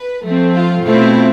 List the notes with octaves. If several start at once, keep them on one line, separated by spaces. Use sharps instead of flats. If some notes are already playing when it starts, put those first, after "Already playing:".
Already playing: B4
F3 A3 C4
F4
B2 A3 C4 E4 F4